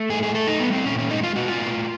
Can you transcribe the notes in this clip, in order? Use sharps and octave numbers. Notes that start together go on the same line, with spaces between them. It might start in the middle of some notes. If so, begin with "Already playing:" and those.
Already playing: A3
A2 G#4
G#4
A3 A4
D#4
G3 B3
C4
A#2 C#4
C#4
G#3 D#4
F4
B2 F#4
F4
A2